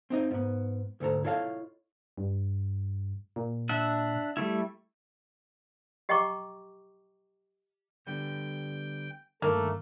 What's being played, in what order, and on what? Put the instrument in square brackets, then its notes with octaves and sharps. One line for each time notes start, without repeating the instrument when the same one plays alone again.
[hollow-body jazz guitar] C4 D#4 D#5
G#2 B3
D2 G#2 A4 A#5
E4 F4 A4 C#5 D#5 F5
[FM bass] G2
A#2
[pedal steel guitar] D4 E5 F#5
G3 A3 E4
[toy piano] G4 D#5 G5 A#5 C#6 D6
[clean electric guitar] D3 G3 B3 [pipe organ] G5
[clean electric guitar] G2 [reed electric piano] D#3 [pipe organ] A3 [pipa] A#3